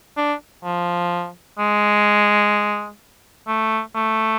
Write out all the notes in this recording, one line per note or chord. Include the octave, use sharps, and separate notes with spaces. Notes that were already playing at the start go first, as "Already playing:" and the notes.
D4
F3
G#3
A3
A3